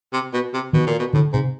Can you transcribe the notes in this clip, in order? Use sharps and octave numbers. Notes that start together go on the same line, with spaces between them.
C3
B2
C3
B2 D#3
A#2
B2
A2 D3
G#2 C3